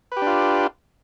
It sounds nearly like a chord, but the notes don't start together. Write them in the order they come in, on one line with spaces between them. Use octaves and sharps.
B4 G4 D4 F4